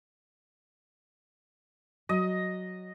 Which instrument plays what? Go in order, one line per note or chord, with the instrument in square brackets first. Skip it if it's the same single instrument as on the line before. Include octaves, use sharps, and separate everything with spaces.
[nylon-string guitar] F#3 [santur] D#5